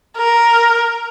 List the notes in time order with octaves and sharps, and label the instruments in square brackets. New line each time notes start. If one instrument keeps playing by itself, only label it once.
[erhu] A#4